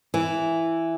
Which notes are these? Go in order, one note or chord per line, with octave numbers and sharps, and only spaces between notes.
E3